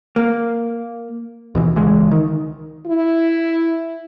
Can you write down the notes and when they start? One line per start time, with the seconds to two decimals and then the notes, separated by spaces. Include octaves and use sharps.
0.16 A#3
1.55 D#2 B2 E3
1.76 C#2 E3 G#3
2.11 D#3
2.86 E4